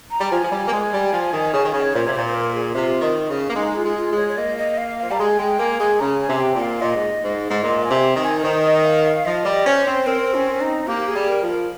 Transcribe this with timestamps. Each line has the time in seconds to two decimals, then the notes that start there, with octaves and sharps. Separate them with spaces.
0.10 A#5
0.20 G3
0.31 F3 G#5
0.43 F3
0.51 G3
0.67 A#3
0.72 G#3
0.92 G3
1.12 F3
1.33 D#3
1.53 C#3
1.64 D#3
1.72 C#3
1.82 C#5
1.94 A#2 C5
2.05 C3 C#5
2.13 A#2 C5
2.26 C5
2.34 A#4
2.54 G#4
2.74 C3 F4
3.01 D#3
3.29 C#3
3.49 A#3
3.56 G#3 D#4
3.76 F4
3.83 G#3
3.97 F4
4.11 G#3
4.17 C#5
4.28 C#5
4.37 A#3 D#5
4.58 D#5
4.78 F5
4.99 F3 F5
5.10 G3 A#5
5.19 G#3 G#5
5.39 G#3 G5
5.59 A#3 G#5
5.79 G#3 G#5
6.00 C#3 A#5
6.21 G#5
6.28 C3
6.41 G5
6.55 A#2
6.61 F5
6.81 A#2 D#5
6.94 G#2
7.23 G#2
7.50 G#2
7.62 A#2 D#5
7.83 G#5
7.90 C3
8.16 D#3
8.23 G#5
8.39 A#4
8.43 D#3 C5
8.64 D#5
8.85 F5
9.04 F5
9.25 F3 D#5
9.45 G3
9.65 C#4 C5
9.86 C4
10.06 C4 A#4
10.34 C#4
10.61 D#4
10.87 A#3 G4
11.08 G#4
11.15 G3
11.28 A#4
11.41 F3
11.48 A#4